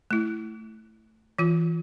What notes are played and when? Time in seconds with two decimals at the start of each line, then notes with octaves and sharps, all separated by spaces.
0.11 A3 E4
1.39 E3 F4